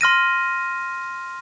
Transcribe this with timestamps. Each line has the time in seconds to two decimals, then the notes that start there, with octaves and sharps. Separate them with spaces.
0.01 C6 F6 A#6 D#7